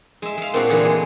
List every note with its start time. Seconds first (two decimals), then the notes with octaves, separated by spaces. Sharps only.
0.22 G#3 E5
0.37 G#3 F5
0.53 A#2 C4 D4 F#4
0.69 A#2 D3 E3 F#4 G#4 A4
0.85 G#3